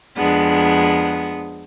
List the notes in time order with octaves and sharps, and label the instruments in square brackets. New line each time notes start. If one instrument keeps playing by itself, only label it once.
[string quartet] F2 G#3 B3 D4